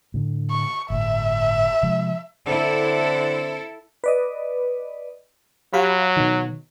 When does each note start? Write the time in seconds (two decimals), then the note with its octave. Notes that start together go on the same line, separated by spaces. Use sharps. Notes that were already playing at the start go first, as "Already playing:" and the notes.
0.14 A2 D3
0.51 C#6
0.90 G1 A2 E5
1.83 C3 F3 G#3
2.46 D3 C4 E4 A4
4.04 B4 D5 D#5
5.73 F#3 G4 F5 B5
6.17 B2 D#3